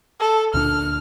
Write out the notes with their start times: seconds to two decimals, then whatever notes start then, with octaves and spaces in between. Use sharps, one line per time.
0.20 A4
0.54 D2 A#2 D4 F6